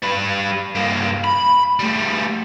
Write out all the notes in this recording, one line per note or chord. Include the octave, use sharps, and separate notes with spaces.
G3 B4
G2 A#3
B5
G3 A3